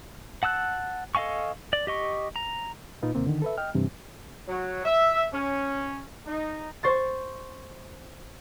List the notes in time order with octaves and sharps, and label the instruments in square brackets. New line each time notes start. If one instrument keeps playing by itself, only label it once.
[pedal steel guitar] F#5 A5 E6 F#6
A4 D#5 F5 G#5 C#6
D5
G4 D#5 C#6
A#5
[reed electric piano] A#2 D#4 F4 B4
D#2 C3 A#3 C4
D3 D#3
A4 B4 E5
D#5 G5 F6
G2 C3 E3 C4
[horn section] F#3
E5
C#4
D#4
[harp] C5 C#6 A6